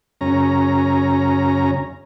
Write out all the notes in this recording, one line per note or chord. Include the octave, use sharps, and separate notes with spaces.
F#2 C#3 C#4 A#5